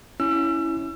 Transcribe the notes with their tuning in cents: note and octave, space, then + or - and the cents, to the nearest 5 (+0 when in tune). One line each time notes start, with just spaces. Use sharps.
C#4 +10 E4 +0 E6 +35